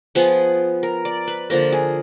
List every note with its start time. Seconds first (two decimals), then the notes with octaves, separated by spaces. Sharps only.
0.15 F3 B3 G#4
0.83 A#4
1.05 D5
1.27 B4
1.50 D3 F3 A#3 A#4
1.72 G#4